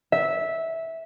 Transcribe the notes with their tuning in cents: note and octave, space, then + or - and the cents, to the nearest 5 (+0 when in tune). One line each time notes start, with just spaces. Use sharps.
E5 -10